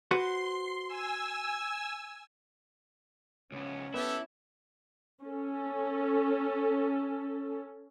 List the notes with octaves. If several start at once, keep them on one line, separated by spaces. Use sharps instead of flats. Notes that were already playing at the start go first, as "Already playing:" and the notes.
F#4 B4 C5 C6
G#5 E6
C#2 B3 C#4
B3 E4 G4 A4 E5
C#4 A4